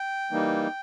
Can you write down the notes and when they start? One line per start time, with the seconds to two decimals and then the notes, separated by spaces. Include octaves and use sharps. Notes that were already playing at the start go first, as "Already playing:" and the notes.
Already playing: G5
0.31 E3 G3 A#3 D#4